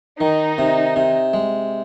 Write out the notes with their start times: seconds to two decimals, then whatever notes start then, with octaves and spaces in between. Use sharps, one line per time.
0.21 D#3 D#4
0.58 C3
0.96 C3
1.34 G#3